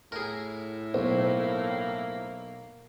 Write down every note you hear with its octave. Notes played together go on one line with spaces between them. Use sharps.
A2 E4 G#4 A#4
B1 A#3 C5